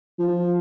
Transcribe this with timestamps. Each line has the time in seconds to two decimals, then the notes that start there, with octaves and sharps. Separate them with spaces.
0.19 F3